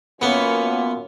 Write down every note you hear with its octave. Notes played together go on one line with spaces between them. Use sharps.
F#2 A#3 B3 C#4 F4